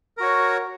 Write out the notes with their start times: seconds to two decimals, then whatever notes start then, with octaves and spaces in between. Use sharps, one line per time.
0.17 A#4
0.20 F#4
0.23 C#5